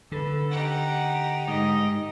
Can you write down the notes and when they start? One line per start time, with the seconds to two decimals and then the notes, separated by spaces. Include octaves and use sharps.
0.12 D3 A4 B4
0.51 D#4 G4 F#5
1.48 G#2 D#5